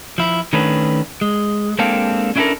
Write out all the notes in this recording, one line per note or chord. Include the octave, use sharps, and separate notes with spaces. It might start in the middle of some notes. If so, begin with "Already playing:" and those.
F3 E4
D#3 A3 C#4 D4 B4
G#3
G#3 A#3 C4 D4 A4 F5
C#4 D4 E4 G4 A4 A#4